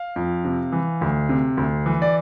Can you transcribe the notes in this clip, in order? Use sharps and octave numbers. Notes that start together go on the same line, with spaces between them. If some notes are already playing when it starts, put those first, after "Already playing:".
Already playing: F5
F2
C3
E3
D2
C3
D2
E3
D5